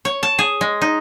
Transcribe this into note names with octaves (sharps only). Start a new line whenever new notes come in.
C#5
A5
G#4
G#3
D#4